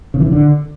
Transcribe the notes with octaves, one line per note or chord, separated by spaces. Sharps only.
C#3
E3
C#3
D3